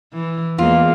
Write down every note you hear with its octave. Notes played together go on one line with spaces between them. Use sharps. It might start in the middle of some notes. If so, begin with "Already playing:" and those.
E3
E2 G#3 A#3 F4